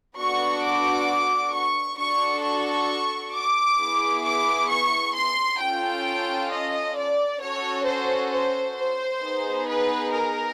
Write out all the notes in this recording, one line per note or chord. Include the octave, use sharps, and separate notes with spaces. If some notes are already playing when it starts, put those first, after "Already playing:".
B3 D4 F#4 A4 C#6
D6
C#6
D4 F#4 A4 C#6
C#6
D6
B3 E4 G#4
D6
C#6
C6
C#4 F4 A4 G5
D#5
D5
C#4 F#4 A4 C#5
C5
C5
C5
B3 D#4 G#4
B4
A#4